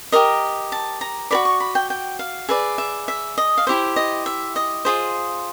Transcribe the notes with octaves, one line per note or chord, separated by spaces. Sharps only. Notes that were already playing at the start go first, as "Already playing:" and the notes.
G4 A#4 D#5 A#5
A5
A#5
F#4 A#4 D5 B5
C#6
B5
G5
G5
F5
G#4 B4 D5 E5
E5
E5
D#5
F5
E4 G4 C5 E5
D#5
E5
D#5
F4 G#4 C5